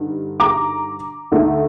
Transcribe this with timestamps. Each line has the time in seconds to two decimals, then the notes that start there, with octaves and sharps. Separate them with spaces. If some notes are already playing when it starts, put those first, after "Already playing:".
Already playing: G2 D3 D#4
0.40 A#5 D6
1.32 D2 D3 A3 D#4